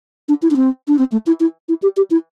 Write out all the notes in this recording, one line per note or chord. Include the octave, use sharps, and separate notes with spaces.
D4
E4
D4
C4
D4
C4
A3
E4
E4
E4
G4
G4
E4